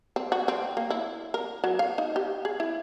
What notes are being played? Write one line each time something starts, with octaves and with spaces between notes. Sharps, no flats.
C4
F#4
C4
A#3
E4
A#4
F#3
F5
D#4
G4
G#4
E4